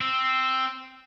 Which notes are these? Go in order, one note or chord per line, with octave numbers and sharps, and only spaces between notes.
C4 E6